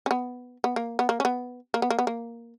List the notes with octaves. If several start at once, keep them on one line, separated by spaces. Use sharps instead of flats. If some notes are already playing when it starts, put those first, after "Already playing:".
C#4
B3
B3
A#3
B3
A#3
C#4
B3
A#3
B3
A#3
B3
A#3